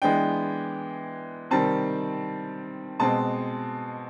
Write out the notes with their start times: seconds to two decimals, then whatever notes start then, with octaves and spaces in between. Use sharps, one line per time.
0.02 E3 G#3 B3 D4 G5
1.51 C3 D#3 G3 C4 A5
2.99 B2 G#3 C4 A5